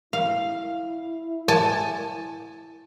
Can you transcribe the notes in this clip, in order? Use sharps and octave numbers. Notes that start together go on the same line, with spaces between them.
E4 F5
G#5 A5